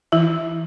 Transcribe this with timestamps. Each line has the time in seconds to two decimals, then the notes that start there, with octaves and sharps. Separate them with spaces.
0.12 E3 E4 E5